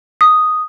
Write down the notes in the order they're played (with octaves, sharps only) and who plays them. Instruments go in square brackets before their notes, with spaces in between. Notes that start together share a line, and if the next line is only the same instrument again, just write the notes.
[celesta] D#6